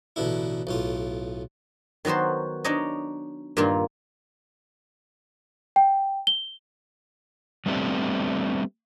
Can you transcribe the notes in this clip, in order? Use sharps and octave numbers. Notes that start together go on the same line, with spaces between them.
A1 B2 D3 E4
B1 A2 F4
D#3 F#3 B3 F#4 C5
D4 D#4 C#5 D#5
G2 A#2 D#3 A#3 F4
G5
G7
G3 A3 B3 C4 D4 G4